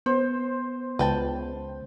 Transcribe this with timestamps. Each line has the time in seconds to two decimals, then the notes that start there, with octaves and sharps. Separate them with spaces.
0.06 B3 C5
0.99 C#2 B4 G5 A5